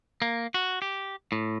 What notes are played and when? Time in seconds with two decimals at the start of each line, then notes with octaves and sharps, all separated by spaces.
0.22 A#3
0.54 F#4
0.82 G4
1.32 A2